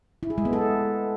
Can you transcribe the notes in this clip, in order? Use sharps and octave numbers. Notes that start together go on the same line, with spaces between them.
E4
G#4
G#3
B3
A4